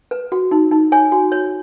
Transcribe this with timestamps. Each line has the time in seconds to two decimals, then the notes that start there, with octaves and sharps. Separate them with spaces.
0.11 B4
0.32 F#4
0.51 D#4
0.71 D#4
0.92 C#5 G#5
1.12 F#4
1.32 C#5